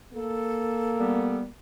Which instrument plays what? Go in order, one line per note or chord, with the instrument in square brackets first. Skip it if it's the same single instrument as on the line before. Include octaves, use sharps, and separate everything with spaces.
[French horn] A#3 [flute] A4
[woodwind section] G3 B3